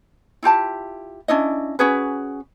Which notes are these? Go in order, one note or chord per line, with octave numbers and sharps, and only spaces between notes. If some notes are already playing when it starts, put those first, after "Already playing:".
E4 F4 G4 A5
C#4 D4 E4 D#5
C#4 F#4 G#4 B4